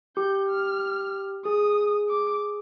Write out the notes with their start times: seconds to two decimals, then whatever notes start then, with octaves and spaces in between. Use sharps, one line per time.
0.16 G4 G6
0.49 F6
1.45 G#4 D#6
2.10 D6